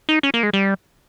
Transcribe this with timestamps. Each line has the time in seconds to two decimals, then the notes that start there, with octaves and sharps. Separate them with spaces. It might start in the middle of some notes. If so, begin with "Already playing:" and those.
0.09 D#4
0.23 C#4
0.34 A#3
0.43 G#3
0.53 G3